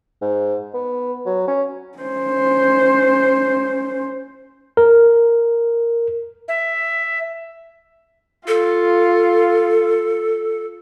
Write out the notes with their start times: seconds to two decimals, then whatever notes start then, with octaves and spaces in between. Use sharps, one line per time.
0.21 G#2
0.74 B3
1.26 F#3
1.47 C#4
1.98 C#4 C5
4.77 A#4
6.48 E5
8.48 F4 A4